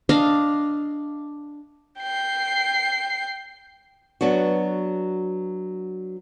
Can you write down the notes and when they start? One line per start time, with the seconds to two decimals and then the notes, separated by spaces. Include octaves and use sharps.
0.09 D4 D#5 F5
2.01 G5 C7
4.21 F#3 B3 D4 F#4